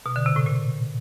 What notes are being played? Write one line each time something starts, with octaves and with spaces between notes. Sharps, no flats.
B2
D3
C3
A2
A#2